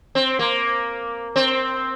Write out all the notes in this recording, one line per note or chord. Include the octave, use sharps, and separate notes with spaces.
C4
A#3
C4